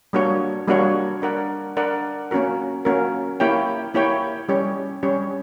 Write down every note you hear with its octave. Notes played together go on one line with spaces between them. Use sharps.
G3 A#3 D4 F#4 C#5
G3 A#3 D4 F#4 C#5
D4 A#4 D5 F#5
D4 A#4 D5 F#5
A#3 C#4 F#4 A#4
A#3 C#4 F#4 A#4
A#3 E4 G4 C#5 G5
A#3 E4 G4 C#5 G5
G3 C#4 G4 C#5
G3 C#4 G4 C#5